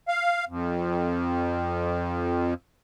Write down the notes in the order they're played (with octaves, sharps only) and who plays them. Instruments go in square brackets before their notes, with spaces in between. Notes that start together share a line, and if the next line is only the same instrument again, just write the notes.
[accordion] F5
F2